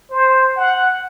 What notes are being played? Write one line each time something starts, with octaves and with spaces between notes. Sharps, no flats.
C5
F#5